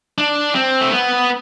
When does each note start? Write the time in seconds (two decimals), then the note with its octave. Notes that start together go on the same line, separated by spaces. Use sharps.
0.18 D4
0.55 C4
0.81 A3
0.92 B3